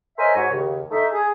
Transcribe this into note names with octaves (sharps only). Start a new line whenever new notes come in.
A#4 C5 C#5 D#5 E5 G#5
G#2 F#4 C#5
D#2 C#3
A3 D#4 E5
G#4